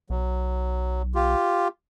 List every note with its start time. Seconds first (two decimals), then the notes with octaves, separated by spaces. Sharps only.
0.10 B1 F#3
1.15 F4 G4